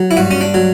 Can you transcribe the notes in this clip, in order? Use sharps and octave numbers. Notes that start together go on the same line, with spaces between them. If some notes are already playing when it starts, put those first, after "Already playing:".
Already playing: F#3
E4
G2 F#4
C#4
D4
F#3